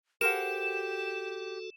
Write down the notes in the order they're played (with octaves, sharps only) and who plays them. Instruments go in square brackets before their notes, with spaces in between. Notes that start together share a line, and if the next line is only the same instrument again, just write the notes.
[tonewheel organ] F#4 A4 [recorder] G4 [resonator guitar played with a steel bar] A#4 C5 F#5 [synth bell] E7